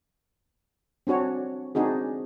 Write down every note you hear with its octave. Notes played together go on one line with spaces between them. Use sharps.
C4 D4 F#4 C#5
C4 D4 D#4 F#4 G#4